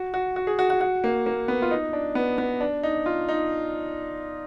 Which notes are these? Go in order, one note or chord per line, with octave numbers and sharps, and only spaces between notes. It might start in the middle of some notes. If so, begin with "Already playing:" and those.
Already playing: F#4
F#4
F#4
G#4
F#4
F#4
F#4
A#3
A#3
B3
F4
D#4
D4
B3
B3
D4
D#4
F4
D#4